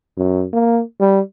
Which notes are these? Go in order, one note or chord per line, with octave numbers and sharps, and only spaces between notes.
F#2
A#3
G3